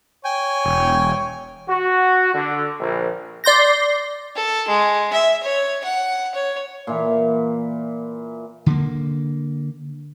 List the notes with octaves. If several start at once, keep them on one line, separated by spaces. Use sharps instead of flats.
C#5 G5 G#5
E1
F#4
D3
A#1
D5 C6 G6 A#6
A4
G#3
E5
C#5
F#5
C#5
A#2 E3
D3 A#3